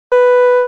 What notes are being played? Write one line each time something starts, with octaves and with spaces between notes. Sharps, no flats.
B4